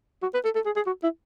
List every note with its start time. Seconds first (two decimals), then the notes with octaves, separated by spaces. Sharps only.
0.22 F#4
0.34 B4
0.44 A4
0.55 A4
0.65 G#4
0.76 G#4
0.86 F#4
1.03 E4